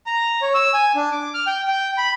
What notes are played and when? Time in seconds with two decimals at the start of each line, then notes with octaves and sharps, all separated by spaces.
0.06 A#5
0.42 C#5
0.54 E6
0.74 G#5
0.95 D4
1.12 D6
1.34 F6
1.47 G5
1.67 G5
1.98 B5